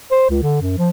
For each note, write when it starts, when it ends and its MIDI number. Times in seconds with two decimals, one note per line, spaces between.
0.11 0.28 72
0.30 0.39 37
0.42 0.59 50
0.61 0.74 42
0.78 0.90 53